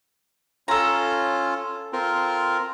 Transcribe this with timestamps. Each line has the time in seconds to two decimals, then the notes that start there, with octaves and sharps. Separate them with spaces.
0.68 C#4 F4 A4 A#5
1.93 C4 F4 A#4